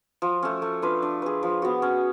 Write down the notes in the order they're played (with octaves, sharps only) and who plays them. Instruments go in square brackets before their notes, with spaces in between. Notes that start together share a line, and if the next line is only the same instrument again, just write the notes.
[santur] F3
A3 C#4
A3
D4 F4 B4
D4
G#4 B4
F3
B3 F#4
C#4